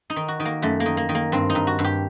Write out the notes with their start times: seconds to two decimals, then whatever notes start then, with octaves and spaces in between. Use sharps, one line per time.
0.10 D#4
0.16 D#3
0.28 F#4
0.40 D#3
0.45 A#3
0.62 F#2 A3
0.80 A#3
0.86 D#3
0.97 A#3
1.09 D#3
1.15 A#3
1.32 G2 C4
1.50 D#4
1.55 G2
1.67 F#4
1.79 G2
1.84 G4